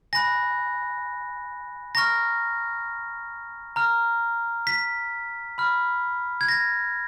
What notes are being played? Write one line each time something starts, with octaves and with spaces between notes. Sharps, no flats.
G#5 B5 F#6 A#6
A#5 C#6 F6 A#6
A#5 F6
B6
B5 F6
G#6
A#6